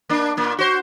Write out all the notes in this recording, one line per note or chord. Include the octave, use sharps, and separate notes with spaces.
A#3 D4
A#2 A#3
F#4 C5